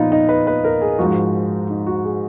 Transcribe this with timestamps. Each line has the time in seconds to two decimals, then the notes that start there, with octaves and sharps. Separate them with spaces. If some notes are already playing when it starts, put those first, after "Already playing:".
Already playing: A#2 F3 B3 D#4 F4
0.12 D#4
0.29 B4
0.47 B4
0.65 A#4
0.81 G#4
0.99 G#2 F3 G#3 F#4
1.69 D#4
1.87 F#4
2.04 G#4